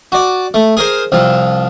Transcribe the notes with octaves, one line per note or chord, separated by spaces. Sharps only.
F#4 D5
A3
G#4 A#4 C5
C2 F3